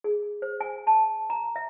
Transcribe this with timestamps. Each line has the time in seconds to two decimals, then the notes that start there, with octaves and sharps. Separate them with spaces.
0.04 G#4
0.42 C5
0.61 G#5
0.87 A5
1.30 A#5
1.56 E5